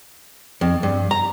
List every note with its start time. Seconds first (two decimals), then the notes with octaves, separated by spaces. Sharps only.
0.61 F2
0.83 G2
1.11 A#5